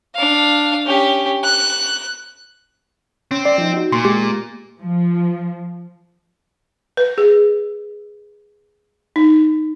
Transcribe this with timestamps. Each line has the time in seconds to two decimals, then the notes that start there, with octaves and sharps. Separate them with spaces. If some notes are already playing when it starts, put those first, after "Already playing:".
0.15 D4 F5
0.86 C#4 G4
1.45 F#6
3.31 C4 C#4
3.45 D5
3.58 F3 D#4
3.74 D#4 F#4
3.93 A#2 C6 C#6
4.05 G#3 G4
4.80 F3
6.97 B4
7.18 G#4
9.16 D#4